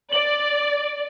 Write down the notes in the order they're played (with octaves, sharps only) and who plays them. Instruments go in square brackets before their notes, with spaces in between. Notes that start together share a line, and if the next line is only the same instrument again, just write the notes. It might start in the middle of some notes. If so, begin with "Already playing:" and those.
[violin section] D5 [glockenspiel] F#7